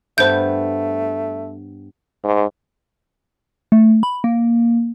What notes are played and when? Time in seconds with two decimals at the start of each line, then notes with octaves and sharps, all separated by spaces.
0.18 G2 A3 B3 B4 C5 G6
2.25 G#2
3.72 A3
4.03 B5
4.24 A#3